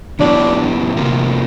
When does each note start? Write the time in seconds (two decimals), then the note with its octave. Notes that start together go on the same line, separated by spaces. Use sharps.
0.19 C#3 F#3 B3 D4 E4 G4
0.97 C3 F3 A#3